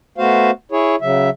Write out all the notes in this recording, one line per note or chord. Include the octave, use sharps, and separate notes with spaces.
A3 B3 F#4 C5 F5
E4 G#4 C#5
C#3 F#3 E5